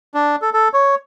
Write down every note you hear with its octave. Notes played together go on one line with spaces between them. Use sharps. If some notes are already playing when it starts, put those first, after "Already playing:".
D4
A4
A4
C#5